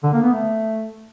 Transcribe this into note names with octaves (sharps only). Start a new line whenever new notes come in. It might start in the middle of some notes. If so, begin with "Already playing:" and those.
D3
A#3
B3
A3